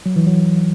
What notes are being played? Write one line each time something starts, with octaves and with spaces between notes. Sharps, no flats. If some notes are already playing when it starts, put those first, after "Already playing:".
F#3
E3
F#3